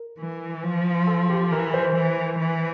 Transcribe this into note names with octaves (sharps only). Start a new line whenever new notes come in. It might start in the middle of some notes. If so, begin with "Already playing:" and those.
Already playing: A#4
E3
F3
A4
G4
E3 A#4
C5
E3
E3